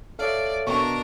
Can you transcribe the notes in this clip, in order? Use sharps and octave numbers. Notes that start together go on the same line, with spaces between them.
A4 C#5 D5 E5 F5
B2 D4 A#4 C#6